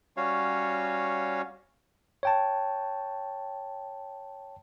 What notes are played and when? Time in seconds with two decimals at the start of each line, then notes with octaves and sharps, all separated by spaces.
0.17 G3 C#4 F#4 C#5 F5
2.23 C#5 G5 A5